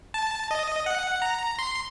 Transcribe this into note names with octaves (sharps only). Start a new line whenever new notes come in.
A5
D#5
F#5
A#5
C6